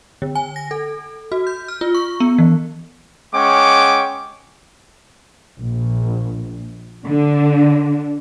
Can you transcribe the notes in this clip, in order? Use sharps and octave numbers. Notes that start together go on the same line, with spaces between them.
D3
G#5
A#6
A4
F#4
G6
F6
F4
C#6
B3
E3
G#3 C#4 F#5 G5 C#6 D6
A#1
D3